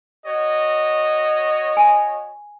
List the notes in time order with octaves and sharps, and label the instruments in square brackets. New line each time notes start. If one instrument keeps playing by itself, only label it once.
[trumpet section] F#4 C#5 D#5
[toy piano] G#5